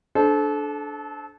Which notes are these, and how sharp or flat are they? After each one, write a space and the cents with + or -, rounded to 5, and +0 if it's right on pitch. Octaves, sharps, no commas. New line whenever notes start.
D4 +0 A4 -30 C5 +0